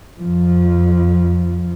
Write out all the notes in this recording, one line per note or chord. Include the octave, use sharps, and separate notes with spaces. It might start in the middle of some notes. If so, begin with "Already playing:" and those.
F2 F3